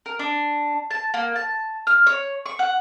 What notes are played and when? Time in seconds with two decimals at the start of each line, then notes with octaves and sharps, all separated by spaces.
0.06 A#4
0.19 D4
0.91 A5
1.14 A#3
1.36 A5
1.87 F6
2.07 C#5
2.46 C#6
2.59 F#5